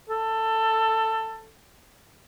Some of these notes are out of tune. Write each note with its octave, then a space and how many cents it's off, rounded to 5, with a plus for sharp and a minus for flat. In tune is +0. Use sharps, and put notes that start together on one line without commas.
A4 +15